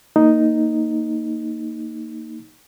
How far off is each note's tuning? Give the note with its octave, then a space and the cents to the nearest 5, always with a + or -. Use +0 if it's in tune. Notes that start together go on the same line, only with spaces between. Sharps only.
A#3 -15 D#4 +0